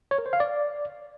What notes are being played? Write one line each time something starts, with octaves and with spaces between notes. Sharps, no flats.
C#5
A#4
C5
F5
D5